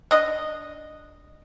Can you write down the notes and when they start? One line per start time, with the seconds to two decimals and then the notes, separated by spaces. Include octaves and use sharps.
0.11 D4 D#5